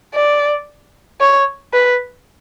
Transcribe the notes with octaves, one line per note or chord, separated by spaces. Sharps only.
D5
C#5
B4